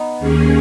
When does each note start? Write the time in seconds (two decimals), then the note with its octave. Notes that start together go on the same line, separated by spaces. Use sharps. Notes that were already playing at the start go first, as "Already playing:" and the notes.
Already playing: B3 D#4
0.19 D#2 D#3 A#3 C#4 G#4